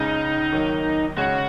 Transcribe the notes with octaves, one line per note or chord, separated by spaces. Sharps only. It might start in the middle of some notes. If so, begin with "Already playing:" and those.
Already playing: C#2 C#3 G#3 D#4
D#3 F#3 A#3
C#3 G#3 C#4 F#4